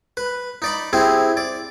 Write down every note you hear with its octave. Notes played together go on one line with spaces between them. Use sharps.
B4
D#4 D5 B5
C4 E4 G4 G#4
D5